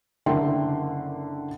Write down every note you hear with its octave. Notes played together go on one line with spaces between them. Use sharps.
F#1 D3 A#4 E5 G5 C6